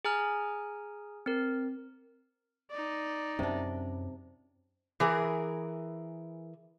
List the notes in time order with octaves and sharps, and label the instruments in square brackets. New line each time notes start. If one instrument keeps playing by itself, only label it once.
[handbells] G#4 G#5 A#5 F6
C4 A#4
[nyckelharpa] D#4 D5
[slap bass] F#2 F#3 C#4 [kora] C3 D4
[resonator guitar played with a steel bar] E3 G#4 A#4